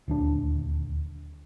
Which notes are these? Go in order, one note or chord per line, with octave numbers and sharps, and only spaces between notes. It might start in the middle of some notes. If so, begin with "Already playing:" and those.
D#1 D2 D4